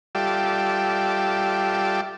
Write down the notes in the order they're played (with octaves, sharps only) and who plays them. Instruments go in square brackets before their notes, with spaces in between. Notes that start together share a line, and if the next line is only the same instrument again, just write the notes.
[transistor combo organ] G3 F4 G4 A4 D5 E5